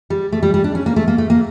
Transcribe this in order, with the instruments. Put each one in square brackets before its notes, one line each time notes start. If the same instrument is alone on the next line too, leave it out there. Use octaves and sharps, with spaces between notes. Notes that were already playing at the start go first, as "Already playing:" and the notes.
[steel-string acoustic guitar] G3
A3
G3
G3
D4
C#4
A#3
A3
A#3
A3
A#3